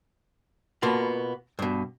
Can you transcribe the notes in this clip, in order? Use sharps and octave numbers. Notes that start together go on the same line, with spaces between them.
B2 A#3 B3 F4 A5 B5
G2 B2